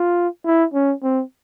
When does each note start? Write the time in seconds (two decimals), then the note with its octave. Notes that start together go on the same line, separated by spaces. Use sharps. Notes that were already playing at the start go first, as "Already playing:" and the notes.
Already playing: F4
0.45 E4
0.74 C#4
1.03 C4